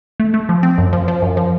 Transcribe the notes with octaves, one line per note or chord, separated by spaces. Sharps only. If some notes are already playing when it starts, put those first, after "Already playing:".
A3
A3
F3
C4
F#2
F3
F3
F#2
F3